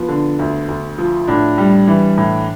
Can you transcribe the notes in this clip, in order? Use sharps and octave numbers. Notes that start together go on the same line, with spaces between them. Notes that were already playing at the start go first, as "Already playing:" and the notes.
Already playing: F3 B3
D3
D2
D2
F3
A2 D4
G3
E3
A2